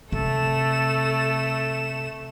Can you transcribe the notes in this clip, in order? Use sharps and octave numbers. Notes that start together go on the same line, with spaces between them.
C3 A3 A4 E7